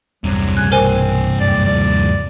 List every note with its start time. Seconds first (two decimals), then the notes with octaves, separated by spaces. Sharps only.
0.24 A#1 E2 G2 C3 F#3
0.57 D#2 C#3 F3 G#5 F#6
0.72 B1 C4 A#4 C5 G#5
1.40 D#1 F#2 D5
1.65 D#2 D#3 F3 D5